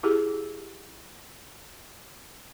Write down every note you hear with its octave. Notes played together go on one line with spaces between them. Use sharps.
E4 G4 G#4